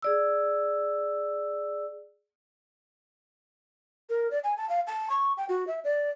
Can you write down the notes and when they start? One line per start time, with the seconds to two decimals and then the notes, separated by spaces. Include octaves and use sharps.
0.02 G#4 D5 E6
4.10 A#4
4.31 D5
4.44 G#5
4.57 A5
4.69 F5
4.87 A5
5.10 C#6
5.37 G5
5.49 F#4
5.67 E5
5.84 D5